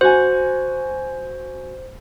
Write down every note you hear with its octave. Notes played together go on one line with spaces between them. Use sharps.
F#4 C5 G#5